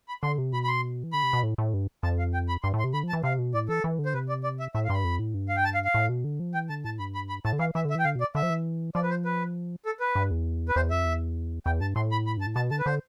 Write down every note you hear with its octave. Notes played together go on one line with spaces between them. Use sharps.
B5
D3 C6
C3
B2 B5
B5
C6
E3
D3 B5
C3
B2
A2
A2
G2
F2 A5
F5
G5
B5
G2 C6
A2
C6
C3
D3 B5
F3
A5
E3
C3 F5
B2
A2 D5
E3 A4
E3
D3
C5
C3 B4
D5
D5
E5
A2 E5
F5
G2 B5 C6
F2
A2
G2
F5
G5
A5
F5
F5
A2
B2
D3
F3
E3 G5
D3 A5
A2 A5
G2 B5
B5
B5
A2 A5
D3
E3 F5
E3 E5
D3
E5
E3 G5
D3 F5
B2
D5
D3 E5
F3
E3
F3 D5
B4
C5
B4
A4
B4
G2
E2
B4
E2 C5
F2 E5
E2
E2 G5
G2 A5
A2 C6
B5
B5
G2 A5
A2
B2 A5
D3 A5
B4
D3 C5